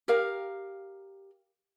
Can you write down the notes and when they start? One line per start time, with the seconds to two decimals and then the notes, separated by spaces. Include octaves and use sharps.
0.08 G4 A#4 F5